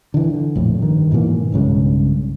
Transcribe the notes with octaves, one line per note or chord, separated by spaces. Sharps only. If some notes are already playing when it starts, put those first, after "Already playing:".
D3 E3
D3
A#1 F2 A2
G2 D#3
G#2 B2 E3 A#3
B1 G2 C#3 G#3